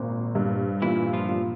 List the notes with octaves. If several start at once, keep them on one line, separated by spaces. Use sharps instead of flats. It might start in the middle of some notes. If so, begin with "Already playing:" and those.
Already playing: G#1 A#2 A#3 C4
G2
A#2 E3 E4
F3 F4
A#2